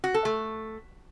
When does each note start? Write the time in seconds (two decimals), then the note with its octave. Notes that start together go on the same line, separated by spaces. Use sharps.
0.04 F#4
0.14 A4
0.25 A3